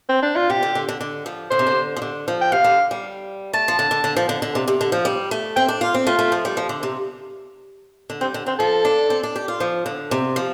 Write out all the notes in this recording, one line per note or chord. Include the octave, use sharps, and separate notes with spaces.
C4
D4
F4
C3 G4
D3
D3
D3
D3
F3
D3 C5
C3
D3
F3
D3
F3
G5
C3 F5
D3
G3
A3 A5
F3
D3
D3
D3
F3
D3
D3
C3
C3
D3
F3
G3
A3
C4 G5
D4
F4 F5
C4
A3 F4
A3
F3
G3
F3
D3
C3
D3
G3 C4
D3
D3 C4
F3 A4
D4
C4
D4
G4
F4
F3
D3
C3
F3